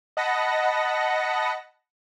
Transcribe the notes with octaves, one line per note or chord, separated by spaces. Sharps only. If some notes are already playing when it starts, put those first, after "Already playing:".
D#5 F#5 A5 B5 A#6 C#7